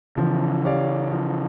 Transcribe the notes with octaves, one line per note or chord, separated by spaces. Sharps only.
C#3 E3 F3
C#4 G4 D5 F5
F3